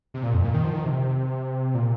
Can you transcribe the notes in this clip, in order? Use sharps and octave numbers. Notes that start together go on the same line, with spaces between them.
C3
A#2
F2
A#2
D#3
F3
D#3
C3
A#2